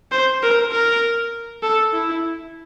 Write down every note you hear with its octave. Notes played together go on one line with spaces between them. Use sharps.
C5
A#4
A#4
A4
E4